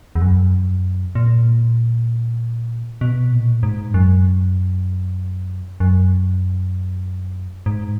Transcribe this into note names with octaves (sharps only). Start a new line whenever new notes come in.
E2
F#2
A#2
B2
A#2
G#2
F#2
F#2
G#2